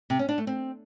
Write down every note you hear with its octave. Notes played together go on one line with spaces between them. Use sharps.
C3
C#4
D4
A3
C4